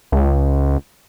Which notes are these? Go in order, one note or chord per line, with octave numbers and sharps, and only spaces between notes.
C#2